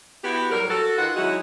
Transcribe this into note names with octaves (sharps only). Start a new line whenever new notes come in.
B3 E4 F#4 G4
A2 F#3 G3 A#4
F#4 A4
D#3 F4 F#4 B4 F#5
F#3 G#3 C#4 D#4 E4 F#4